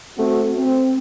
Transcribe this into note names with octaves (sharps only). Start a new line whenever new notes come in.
A3 C4 F#4
C4